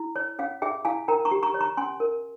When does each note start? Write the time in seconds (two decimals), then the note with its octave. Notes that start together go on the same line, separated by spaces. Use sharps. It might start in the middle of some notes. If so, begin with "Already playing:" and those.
Already playing: E4
0.16 C#5
0.39 C#4 C#5 F5
0.62 G#4 E5 G5
0.85 E4 F5 G#5
1.08 A#4 G5 A#5
1.25 A#5 C#6
1.31 G4
1.43 A#5 C#6
1.54 C#5
1.60 A#5 C#6
1.77 C#4 G#5 C6
2.00 A#4